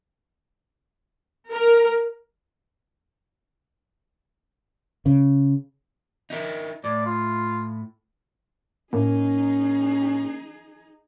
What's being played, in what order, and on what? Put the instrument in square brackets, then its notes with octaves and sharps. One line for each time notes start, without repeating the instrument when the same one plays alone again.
[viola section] A#4
[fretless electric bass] C#3
[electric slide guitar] D#4 E4 A#4
[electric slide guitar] A2 [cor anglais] D5
[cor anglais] F4
[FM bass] A2 [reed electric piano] A#3 [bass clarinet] C#4 [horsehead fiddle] D#4 G#4